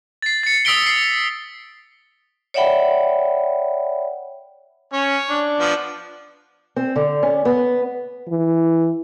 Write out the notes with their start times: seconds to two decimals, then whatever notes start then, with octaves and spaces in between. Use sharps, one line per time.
0.22 A6 C7
0.43 A6 C#7
0.65 D#6 E6 B6 D7 G7
0.87 C7
2.54 C#5 D5 E5 F#5 G5 B5
4.93 C#4 C#5
5.29 D4
5.59 F3 B3
6.76 C4
6.96 D3
7.23 C#4
7.45 B3
8.28 E3